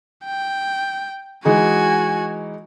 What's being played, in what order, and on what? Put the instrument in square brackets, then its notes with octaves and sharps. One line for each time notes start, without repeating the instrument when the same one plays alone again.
[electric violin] G5
[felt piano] E3 G#3 D#4 [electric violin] F#4 G#5